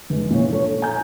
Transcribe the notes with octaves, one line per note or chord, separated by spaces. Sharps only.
F1 G#3
A#2 E3 C#5
D4 A4 C#5
G#5 A#5 G6